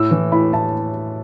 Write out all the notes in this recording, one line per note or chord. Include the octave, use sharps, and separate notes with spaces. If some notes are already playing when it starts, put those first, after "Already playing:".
Already playing: A2 E6
E3
A2 B5
A2 A5